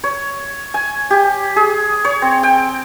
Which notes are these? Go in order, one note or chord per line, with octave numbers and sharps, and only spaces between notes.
C#5
G#5
G4
G#4
C#5
C4
G5